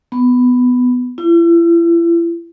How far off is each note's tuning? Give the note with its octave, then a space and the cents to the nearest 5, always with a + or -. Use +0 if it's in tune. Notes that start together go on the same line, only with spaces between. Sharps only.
B3 +10
E4 +40